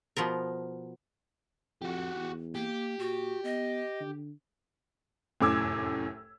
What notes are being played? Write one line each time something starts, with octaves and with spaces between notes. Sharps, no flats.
B2 F3 B3 A#4
F2 F#4 G4
E2
A#3 G4
A#2 F#4
B3 D#5
D3
F1 F#2 A2 D6 E6 G#6